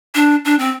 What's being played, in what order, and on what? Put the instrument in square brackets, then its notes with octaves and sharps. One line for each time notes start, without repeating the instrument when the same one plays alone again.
[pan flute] D4
D4
C4